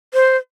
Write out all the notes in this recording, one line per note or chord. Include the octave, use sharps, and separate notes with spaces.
C5